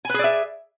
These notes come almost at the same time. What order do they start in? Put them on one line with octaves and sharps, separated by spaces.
G#5 B4 G#4 D5 E5